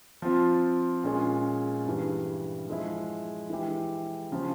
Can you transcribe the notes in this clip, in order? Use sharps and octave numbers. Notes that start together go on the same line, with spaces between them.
F3 C4 F4
A#2 G#3 C#4 F4 G#4
G2 E3 G3
F3 G#3 E4
E3 G#3 E4 G4
C#3 F3